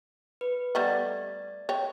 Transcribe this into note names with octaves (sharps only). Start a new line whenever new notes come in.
B4
G3 A3 B3 D5 A6
C#5 G5